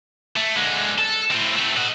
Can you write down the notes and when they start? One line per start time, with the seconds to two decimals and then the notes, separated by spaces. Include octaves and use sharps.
0.36 A3
0.56 D3 G#3
0.98 A4
1.31 A2 C4
1.55 A3 C4
1.77 D#5 F#5